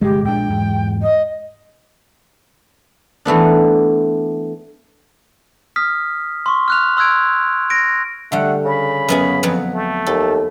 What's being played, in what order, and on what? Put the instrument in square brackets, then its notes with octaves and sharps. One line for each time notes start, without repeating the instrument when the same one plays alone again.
[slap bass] G1 C3 [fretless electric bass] G#3 [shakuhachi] G4
[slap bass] A#1 A#2 D4 [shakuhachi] G5
[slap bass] E2 G#2
[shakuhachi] D#5
[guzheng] E3 A3 B3 D4
[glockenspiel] D#6 F6 B6
C6 C#6
F6 F#6 F7
C6 E6 F#6 G#6 D7
A#6 D7
[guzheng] D3 G3 [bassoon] A3 [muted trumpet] F#5
[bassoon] C#3 [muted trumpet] B5
[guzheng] F#2 B3 G#4
F2 F#3 B3
[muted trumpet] A3
[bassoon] D#2 [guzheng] A4